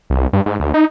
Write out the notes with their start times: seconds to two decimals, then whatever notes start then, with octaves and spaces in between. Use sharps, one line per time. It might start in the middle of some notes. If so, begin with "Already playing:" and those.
0.10 C2
0.33 G2
0.46 G#2
0.60 D2
0.74 D#4